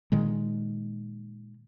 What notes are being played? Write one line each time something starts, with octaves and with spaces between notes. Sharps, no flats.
A#2 D#3 G#3